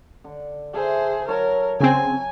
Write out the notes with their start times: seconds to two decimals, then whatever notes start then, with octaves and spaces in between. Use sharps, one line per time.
0.24 D3
0.74 G#4 A4 C5 E5
1.28 F#3 A#4 C#5 A5
1.80 C#3 C4 G#5